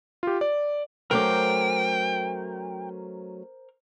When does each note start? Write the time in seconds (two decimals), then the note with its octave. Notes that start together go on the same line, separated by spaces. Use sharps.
0.23 F4 G4
0.41 D5
1.11 F#3 A3 C#4 A#4 C5 G5 D6